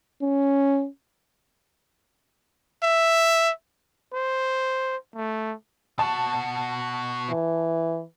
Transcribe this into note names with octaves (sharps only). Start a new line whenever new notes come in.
C#4
E5
C5
A3
B2 F#4 A5
E3